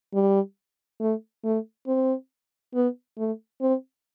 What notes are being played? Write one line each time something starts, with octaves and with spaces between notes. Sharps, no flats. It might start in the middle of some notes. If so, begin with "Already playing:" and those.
G3
A3
A3
C4
B3
A3
C4